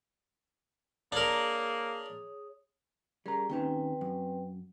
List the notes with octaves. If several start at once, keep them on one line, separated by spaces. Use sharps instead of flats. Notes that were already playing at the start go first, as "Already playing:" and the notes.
A#3 D4 G#4 A#4 C#5 D#6
G3 C#4 G#4 A#4 A#5
D#2 C4 C#4 D#4 B4 G5
F#2